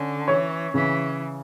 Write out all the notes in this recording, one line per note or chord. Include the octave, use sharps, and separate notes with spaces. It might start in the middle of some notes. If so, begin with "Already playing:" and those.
Already playing: D3 C#4
E3 C#5
C#3 E3